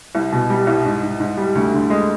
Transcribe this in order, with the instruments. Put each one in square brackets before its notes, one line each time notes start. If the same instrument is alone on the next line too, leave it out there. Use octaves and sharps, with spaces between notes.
[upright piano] C2
B2
G3
C2
G#2
G#2
G#2
G3
D2
D3
G#3